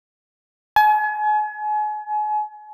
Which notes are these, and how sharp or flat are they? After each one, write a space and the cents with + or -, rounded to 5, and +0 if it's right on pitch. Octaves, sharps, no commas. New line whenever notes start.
G#5 +35